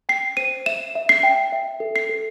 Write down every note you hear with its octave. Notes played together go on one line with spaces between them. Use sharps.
G5 C7
C5 D#7
E5 E7
E5
C7
G5
E5
A4
C7
A4